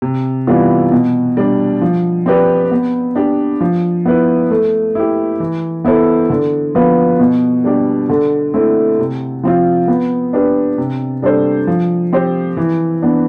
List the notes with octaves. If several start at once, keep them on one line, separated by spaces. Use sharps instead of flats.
C3
E3 G3 B3 F4
B2
G3 D4
F3
C4 G4 B4 D5
B3
D4 G4
F3
B3 E4 B4
A3
E4 G4
E3
B3 E4 A4 C5
D3
F3 B3 F4 B4
B2
G3 D4 G4
D3
A3 C4 E4
C3
F3 C4 F4
B3
D4 G4 B4
C3
G3 D4 A4 C5
F3
C4 G4 C5
E3
B3 D4